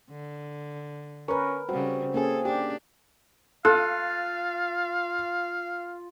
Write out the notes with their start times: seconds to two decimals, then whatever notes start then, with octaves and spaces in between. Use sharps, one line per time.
0.10 D3
1.28 C#4 A#4 B4
1.69 C#3 G3 C4 F#4
2.14 A#3 C#4 G#4 A4
2.45 D4 G4
3.65 F4 A4 F5 F#6